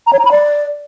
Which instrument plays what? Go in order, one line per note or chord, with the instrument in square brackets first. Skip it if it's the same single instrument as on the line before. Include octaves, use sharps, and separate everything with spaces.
[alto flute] A#5
C#5
A#5
B5
D5